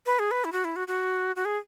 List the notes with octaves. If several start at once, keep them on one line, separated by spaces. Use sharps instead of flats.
B4
G#4
B4
E4
F#4
E4
F#4
F#4
F#4
G#4